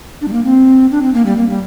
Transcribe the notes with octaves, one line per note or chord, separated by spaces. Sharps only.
D4
G3
A#3
C4
D4
C4
A#3
G3
A#3
G3